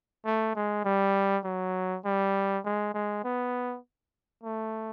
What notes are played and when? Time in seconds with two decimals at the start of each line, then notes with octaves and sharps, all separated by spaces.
0.25 A3
0.56 G#3
0.85 G3
1.44 F#3
2.05 G3
2.65 G#3
2.94 G#3
3.24 B3
4.43 A3